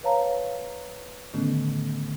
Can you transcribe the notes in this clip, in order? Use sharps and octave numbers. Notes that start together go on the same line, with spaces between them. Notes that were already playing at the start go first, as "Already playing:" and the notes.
B4 C#5 F5 A5 A#5
A2 D3 D#3 A3 B3 C#4